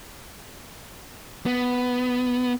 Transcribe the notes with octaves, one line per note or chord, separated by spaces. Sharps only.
B3